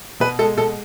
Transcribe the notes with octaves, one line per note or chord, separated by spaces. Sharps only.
B2 B4
G#3 A4
B2 A4